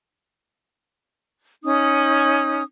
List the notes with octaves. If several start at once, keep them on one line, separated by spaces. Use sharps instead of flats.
C#4 D#4 D#6